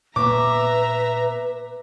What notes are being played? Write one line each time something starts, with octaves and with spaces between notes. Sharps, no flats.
A#2 A#3 B3 B4 E5 A#5 D6